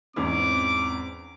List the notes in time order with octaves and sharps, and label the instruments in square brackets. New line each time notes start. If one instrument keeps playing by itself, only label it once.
[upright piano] E2 G#2 C#4 [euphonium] C4 [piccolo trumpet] D6